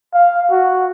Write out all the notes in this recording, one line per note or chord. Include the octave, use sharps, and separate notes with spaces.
F5
F#4